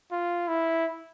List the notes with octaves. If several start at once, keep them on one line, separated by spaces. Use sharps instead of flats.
F4
E4